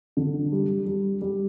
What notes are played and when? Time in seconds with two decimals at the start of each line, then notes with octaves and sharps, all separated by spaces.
0.17 D3
0.52 G3
0.86 G3
1.22 G3